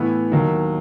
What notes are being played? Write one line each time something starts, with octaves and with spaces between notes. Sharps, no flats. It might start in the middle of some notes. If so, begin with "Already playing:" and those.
Already playing: A2 E3 B3 E4
D#2 D#3 F#3